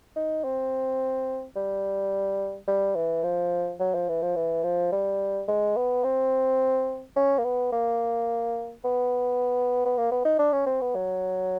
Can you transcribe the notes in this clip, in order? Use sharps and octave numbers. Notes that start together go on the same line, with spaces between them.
D#4
C4
G3
G3
E3
F3
F#3
F3
E3
F3
E3
F3
G3
G#3
B3
C4
C#4
A#3
B3
A#3
B3
B3
A#3
B3
D#4
D4
C#4
C4
B3
F#3